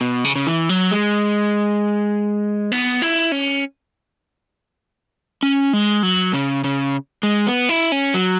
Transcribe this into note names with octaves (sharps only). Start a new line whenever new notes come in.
B2
C#3
C#3
E3
F#3
G#3
B3
E4
C#4
C#4
G#3
F#3
C#3
C#3
G#3
B3
E4
C#4
F#3